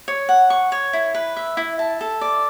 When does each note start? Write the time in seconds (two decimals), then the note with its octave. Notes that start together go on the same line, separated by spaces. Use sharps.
0.08 C#5
0.29 F#5
0.50 C#6
0.72 C#5
0.93 E4
1.15 B4
1.37 E5
1.57 E4
1.79 A5
2.01 A4
2.21 D5